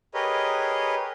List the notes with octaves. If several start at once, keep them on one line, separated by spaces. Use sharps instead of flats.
G4 G#4 A#4 B4 C#5 D#5